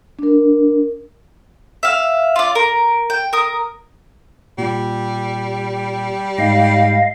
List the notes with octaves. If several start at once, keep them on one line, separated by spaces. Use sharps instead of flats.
D4 A#4
E5 F5
F4 D5
A#4
G5
A#4 D#6
A#2 G3
G#2 D#5 F5